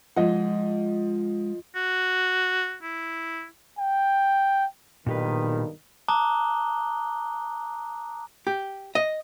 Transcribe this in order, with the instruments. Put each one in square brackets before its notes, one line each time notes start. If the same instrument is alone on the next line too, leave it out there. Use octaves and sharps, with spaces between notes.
[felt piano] F3 D#5 [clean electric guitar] G#3 F#5
[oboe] F#4
E4
[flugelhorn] G5
[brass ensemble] B1 G2 D#3 [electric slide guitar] A#2 G4 B4
[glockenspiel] A5 A#5 D6 D#6 F#6 G7
[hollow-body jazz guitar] G4
D#5